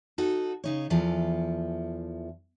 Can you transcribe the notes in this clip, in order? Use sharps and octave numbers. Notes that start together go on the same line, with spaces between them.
D#4 F#4 A4
C#3 D#4 C#5
E2 E3 F3 A4